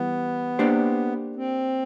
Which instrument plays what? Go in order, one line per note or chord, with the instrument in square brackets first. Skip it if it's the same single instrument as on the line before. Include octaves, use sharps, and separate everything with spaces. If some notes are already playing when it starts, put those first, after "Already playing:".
Already playing: [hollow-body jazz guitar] E3 G3 [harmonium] B3
[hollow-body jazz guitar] A#3 D4 G4 C5
[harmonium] C4